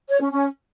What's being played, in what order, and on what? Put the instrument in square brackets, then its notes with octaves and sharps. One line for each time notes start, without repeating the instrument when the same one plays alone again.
[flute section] C#5
C#4
C#4